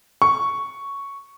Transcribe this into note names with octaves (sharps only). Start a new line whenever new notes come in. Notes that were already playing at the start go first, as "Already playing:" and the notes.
C#6